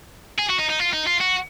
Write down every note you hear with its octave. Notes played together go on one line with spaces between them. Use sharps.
G#4
F#4
D#4
D#4
F4
D#4
F4
F#4